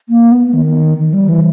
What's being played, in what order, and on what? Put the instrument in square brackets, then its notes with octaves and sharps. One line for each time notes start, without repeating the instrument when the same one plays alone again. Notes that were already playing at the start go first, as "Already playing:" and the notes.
[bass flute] A#3
B3
D#3
D#3
G3
E3